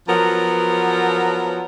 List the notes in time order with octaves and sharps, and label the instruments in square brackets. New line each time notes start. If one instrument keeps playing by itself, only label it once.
[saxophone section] F3 F#3 B3 A#4